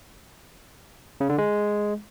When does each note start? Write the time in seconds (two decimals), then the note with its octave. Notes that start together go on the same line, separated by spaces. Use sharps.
1.21 C#3
1.29 D3
1.38 G#3